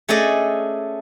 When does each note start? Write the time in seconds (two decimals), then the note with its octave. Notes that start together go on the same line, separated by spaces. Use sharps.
0.09 A3 C#4 G#4 A4 D5 D#5